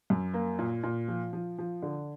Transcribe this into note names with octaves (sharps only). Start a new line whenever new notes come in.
F#2
A#3
A#2
A#2
F3
F3
F3
D3